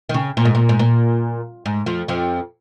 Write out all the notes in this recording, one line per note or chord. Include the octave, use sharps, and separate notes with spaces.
D#3
C#3
A#2
G#2
A#2
G#2
A#2
G#2
F2 F3
F2 F3